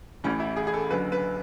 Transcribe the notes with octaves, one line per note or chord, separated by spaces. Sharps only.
A1 A2 E3 C#4
E4
G#4
G#4
A4
F#1 F#2 D3 B4
B4